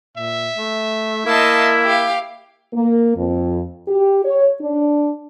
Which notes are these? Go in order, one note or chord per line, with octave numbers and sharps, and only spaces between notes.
A#2 E5
A3
A#3 E4 D#5 A5 C6
G4 F5
A#3
F2
G4
C#5
D4